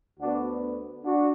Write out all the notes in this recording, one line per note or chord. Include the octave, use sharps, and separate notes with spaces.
D2 D3 B3 D4 F#4
D4 F#4